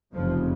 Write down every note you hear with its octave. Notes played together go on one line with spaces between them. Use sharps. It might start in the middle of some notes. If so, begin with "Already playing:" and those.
F1 F2 C#3 F3